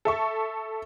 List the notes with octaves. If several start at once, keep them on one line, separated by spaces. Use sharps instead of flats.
A4 E5 C#6